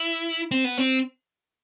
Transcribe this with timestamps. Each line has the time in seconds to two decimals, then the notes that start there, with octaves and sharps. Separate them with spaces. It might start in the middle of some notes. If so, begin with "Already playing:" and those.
Already playing: E4
0.51 C4
0.64 B3
0.78 C4